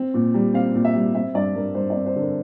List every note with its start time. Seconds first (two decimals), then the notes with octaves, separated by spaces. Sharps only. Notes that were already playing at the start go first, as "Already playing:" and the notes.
Already playing: C4
0.14 A#2
0.34 G3
0.54 C4 F5
0.75 A#2
0.85 E5
0.95 G3
1.14 C4 E5
1.34 G2 D5
1.54 G2 A#4
1.75 G2 C5
1.90 D5
1.96 C4
2.06 C5
2.16 D3
2.21 A#4